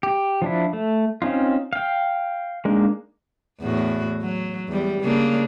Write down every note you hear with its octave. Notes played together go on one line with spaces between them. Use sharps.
G4
F3 D4 E4
A3
C4 C#4 D#4 F4
F5 G5
G#3 A#3 D4 D#4
E2 A2 F#4
F#3
E2 G3
C#3 A#3 D4